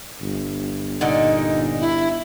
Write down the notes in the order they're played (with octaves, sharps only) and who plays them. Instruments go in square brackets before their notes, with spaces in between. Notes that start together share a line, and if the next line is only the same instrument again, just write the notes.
[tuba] G1
[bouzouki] A#2 D3 D#5 [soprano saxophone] D#4
[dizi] E4